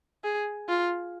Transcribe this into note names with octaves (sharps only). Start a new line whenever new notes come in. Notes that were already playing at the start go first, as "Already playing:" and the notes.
G#4
F4